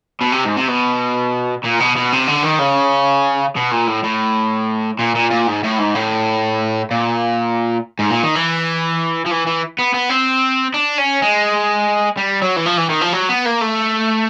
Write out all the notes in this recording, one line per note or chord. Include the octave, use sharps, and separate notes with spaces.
B2
C3
G#2
C3
B2
A#2
B2
B2
C3
D3
D#3
C#3
B2
A#2
A2
A2
A#2
A#2
A#2
G#2
A2
G#2
A2
A#2
G#2
A#2
D#3
E3
F3
E3
E3
B3
B3
C4
D4
C#4
G#3
G3
F#3
E3
F3
E3
D#3
F3
F#3
B3
A#3
A3